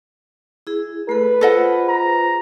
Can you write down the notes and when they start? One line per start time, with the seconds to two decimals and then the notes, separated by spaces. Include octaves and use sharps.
0.67 E4 G#4
1.09 A3 A4 B4
1.41 F4 G#4 A4 C5 D#5 F#5
1.89 A#5